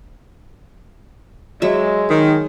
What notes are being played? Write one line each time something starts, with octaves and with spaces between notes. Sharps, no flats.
F#3 G#3 E5
D#3